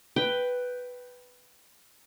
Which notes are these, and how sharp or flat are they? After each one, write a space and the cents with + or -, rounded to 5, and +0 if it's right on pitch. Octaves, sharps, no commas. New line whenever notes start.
B4 +5 G5 +0